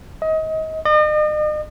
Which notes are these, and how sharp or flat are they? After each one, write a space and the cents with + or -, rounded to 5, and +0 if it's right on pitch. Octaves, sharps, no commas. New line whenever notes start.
D#5 +30
D#5 -40